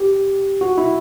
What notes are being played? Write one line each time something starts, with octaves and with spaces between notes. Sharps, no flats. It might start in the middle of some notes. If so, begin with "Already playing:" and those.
Already playing: G4
F#4
E4